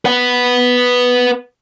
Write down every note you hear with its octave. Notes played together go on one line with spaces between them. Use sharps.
B4 F#5